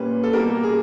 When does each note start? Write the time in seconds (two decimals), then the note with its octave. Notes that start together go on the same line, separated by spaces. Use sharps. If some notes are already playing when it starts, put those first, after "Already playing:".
Already playing: A#2 G3 A#3 C#4 B4
0.23 A4
0.33 B2 G3 A#3 A#4
0.63 G#4